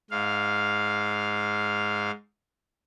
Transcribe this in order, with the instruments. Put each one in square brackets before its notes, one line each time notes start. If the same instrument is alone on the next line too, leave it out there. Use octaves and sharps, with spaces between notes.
[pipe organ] G#2 F5